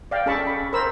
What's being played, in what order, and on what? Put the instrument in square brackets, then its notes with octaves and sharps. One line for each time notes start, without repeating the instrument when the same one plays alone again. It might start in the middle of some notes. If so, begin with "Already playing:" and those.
[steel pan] D5 F5 G5
C#4 G#4 A4 A5 B5 C#6
B5
A#4 C5 B5 E6